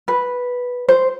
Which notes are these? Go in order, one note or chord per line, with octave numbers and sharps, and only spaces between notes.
B4
C5